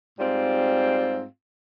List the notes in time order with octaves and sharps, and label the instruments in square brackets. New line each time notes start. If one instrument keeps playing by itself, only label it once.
[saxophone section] G#2 G3 C4 F4